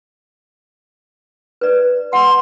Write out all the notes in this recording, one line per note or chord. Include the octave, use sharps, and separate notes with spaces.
B4 D5
F#5 C6